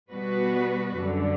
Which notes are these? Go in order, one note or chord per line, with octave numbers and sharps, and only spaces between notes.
B2 G3 B3 F#4 B4
F#2 D3 G3